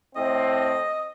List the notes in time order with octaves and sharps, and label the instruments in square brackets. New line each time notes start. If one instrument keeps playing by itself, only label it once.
[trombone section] A2 C4 [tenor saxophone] D#5